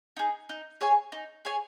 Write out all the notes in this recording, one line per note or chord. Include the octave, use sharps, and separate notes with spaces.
D#4 G#4
D#4
G#4 C#5 G#5
D#4
G#4 C#5 G#5